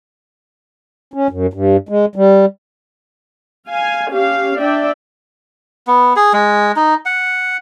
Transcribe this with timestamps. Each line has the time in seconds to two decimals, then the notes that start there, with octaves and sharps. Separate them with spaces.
1.14 C#4
1.30 F#2
1.54 G2
1.89 G#3
2.16 G3
3.67 F5 G#5
4.12 C#4 G4 F5
4.59 D4 D5 E5 G5
5.87 B3
6.16 G#4
6.33 G#3
6.76 D#4
7.06 F#5